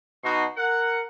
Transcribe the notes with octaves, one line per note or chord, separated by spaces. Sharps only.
B2 D#4 F#4 C6
A#4 F#5